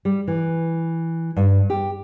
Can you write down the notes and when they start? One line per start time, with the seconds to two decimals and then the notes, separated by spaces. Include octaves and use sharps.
0.05 G3
0.28 E3
1.36 G2
1.70 G4